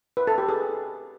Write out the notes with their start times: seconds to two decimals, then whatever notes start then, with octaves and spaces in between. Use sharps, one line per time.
0.17 B4
0.27 A4
0.38 G4
0.48 G#4